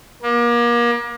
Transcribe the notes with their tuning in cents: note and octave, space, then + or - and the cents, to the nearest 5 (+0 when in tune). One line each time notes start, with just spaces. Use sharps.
A#3 +35